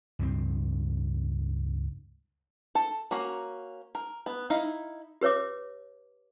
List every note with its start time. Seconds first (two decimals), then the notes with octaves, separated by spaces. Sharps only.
0.19 C#2 G2 A3 C4
2.75 A4
3.11 A#3 C#4 F#4 A#5
3.95 A#4
4.26 B3
4.50 D#4 E4 F5
5.21 G4 B4 C#5 E5 D6